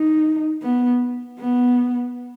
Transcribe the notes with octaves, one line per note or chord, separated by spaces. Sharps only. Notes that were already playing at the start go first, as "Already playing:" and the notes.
Already playing: D#4
B3
B3